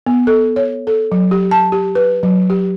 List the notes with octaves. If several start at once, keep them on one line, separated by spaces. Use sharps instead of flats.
B3
A4
C#5
A4
F#3
G4
A5
G4
B4
F#3
G4